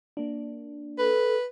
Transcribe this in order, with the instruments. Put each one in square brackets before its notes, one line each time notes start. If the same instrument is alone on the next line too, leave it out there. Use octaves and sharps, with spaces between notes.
[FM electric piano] A#3 D4
[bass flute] A4 [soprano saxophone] B4